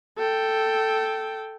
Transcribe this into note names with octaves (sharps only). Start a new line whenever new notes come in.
A4 G5